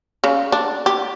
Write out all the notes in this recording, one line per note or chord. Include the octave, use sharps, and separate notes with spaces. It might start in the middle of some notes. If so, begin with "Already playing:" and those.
C#3
D4
G4